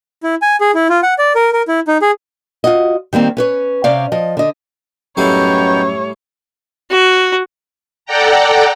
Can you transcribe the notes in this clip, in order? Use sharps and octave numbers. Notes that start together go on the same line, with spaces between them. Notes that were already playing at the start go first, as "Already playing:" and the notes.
E4
G#5
G#4
E4
F4
F#5
D5
A#4
A#4
E4
D#4
G#4
F4 F#4 D#5
D#3 G3 A#3 C4
C#4 B4 C#5
C3 C#4 C5 D5 F5
F3 D#5
D3 D#5
F#2 A2 G3 B3 D#4 E4 C#5 G5
F#4
A4 D5 F#5 G5 A#5